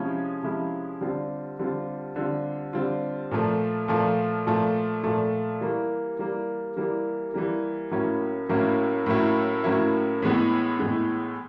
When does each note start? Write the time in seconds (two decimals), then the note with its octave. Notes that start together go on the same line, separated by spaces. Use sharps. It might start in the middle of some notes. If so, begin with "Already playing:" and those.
Already playing: C3 F3 G#3 C#4 E4
0.43 C3 F3 G#3 C#4 E4
1.01 D3 G3 C4 F4
1.59 D3 G3 C4 F4
2.16 D3 G3 C4 F4
2.73 D3 G3 C4 F4
3.31 A#2 F3 A3
3.88 A#2 F3 A3
4.47 A#2 F3 A3
5.03 A#2 F3 A3
5.61 E3 G3 A#3
6.19 E3 G3 A#3
6.77 E3 G3 A#3
7.34 E3 G3 A#3
7.91 A2 F#3 A#3 C#4 E4
8.49 A2 F#3 A#3 C#4 E4
9.06 A2 F#3 A#3 C#4 E4
9.64 A2 F#3 A#3 C#4 E4
10.22 A2 E3 G#3 B3
10.79 A2 E3 G#3 B3